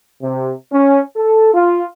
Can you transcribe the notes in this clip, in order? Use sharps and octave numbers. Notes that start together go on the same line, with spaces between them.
C3
C#4
A4
F4